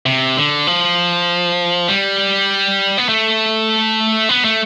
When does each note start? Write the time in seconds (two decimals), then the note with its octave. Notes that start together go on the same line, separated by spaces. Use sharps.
0.06 C3
0.37 D3
0.67 F3
1.88 G3
2.98 B3
3.09 A3
4.29 B3
4.45 A3